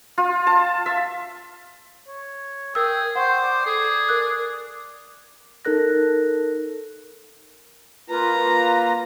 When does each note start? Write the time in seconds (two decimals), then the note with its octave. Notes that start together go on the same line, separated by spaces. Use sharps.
0.18 F4
0.47 A5
0.86 E5
2.07 C#5
2.75 G#4 A#4 G5 E6
3.16 C5 F#5 G5 C6 C#6
3.42 D5
3.66 G#4 A4
4.09 A#4 F#6
5.65 D#4 A4 A#4 F#6 A#6
8.10 A#3 F4 B4 A#5